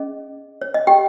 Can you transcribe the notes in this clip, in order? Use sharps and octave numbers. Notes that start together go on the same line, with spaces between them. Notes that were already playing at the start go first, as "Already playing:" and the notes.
Already playing: C#4 G#4 D#5
C#5
D#5
G4 G5